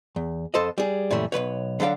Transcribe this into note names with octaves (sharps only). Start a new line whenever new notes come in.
E2
F2 A4 C5 D#5
G3 G#4
F#2 A#2 E3 G3 A3
B1 C#3 B4 C#5
D3 F#3 D4 F5 G5